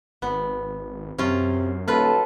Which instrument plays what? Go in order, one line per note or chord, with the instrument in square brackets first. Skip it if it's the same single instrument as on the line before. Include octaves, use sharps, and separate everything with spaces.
[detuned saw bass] G#1 [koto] B3
[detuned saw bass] F#2 [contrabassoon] C3 [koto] C#4 F4
[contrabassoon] D#1 [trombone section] B1 A4 [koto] F4 B4